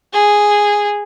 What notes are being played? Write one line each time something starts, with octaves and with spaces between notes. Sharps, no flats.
G#4